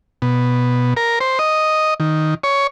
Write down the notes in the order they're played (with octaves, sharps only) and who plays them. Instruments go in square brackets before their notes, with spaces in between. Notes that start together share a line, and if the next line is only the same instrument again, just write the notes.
[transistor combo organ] B2
A#4
C5
D#5
D#3
C#5